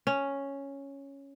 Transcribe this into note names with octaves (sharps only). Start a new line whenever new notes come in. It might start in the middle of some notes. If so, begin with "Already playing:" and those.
C#4